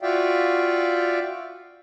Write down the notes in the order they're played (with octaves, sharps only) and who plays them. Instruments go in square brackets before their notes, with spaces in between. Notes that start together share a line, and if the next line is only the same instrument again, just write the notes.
[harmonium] F4 F#4 D5 E5 F5 G5